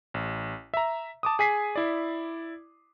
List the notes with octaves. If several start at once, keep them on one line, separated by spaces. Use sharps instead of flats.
A1
E5 A#5
A5 D6 D#6
G#4 G#5 B6 C7
E4 D5